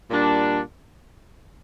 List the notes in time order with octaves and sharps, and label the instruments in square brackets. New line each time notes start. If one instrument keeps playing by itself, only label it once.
[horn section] A#2 G3 D4